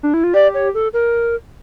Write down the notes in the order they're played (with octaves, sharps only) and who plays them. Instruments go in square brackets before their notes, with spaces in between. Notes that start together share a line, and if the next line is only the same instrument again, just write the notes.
[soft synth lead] D4
E4
F4
[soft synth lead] G4 [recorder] D5
[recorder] C#5
A4
A#4